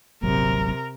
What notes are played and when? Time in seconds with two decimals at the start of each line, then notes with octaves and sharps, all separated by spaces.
0.23 D#1 G#1 C3 F#3 A#4